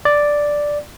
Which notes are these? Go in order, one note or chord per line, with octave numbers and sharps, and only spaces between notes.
D5